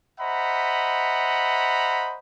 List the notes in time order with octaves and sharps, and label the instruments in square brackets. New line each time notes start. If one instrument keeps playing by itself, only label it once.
[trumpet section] C5 D#5 E5 F#5 A#5 B5